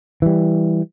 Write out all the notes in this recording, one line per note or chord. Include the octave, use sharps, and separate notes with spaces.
E3 G3